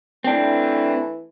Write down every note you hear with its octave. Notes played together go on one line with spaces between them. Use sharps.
E3 A3 C4 D4